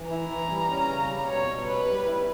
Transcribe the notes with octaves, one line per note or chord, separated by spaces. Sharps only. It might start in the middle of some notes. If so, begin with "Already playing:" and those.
Already playing: E3
E4 A#5
E3
G3
C#4
C#3
G3
B2 C#5
B2
G3 B4
G3
E4